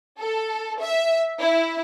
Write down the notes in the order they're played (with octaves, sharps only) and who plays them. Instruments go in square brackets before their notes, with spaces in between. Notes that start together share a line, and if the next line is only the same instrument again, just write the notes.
[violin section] A4
E5
E4